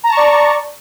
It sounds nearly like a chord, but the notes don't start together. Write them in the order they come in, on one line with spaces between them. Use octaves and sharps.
A#5 A5 C#6 D5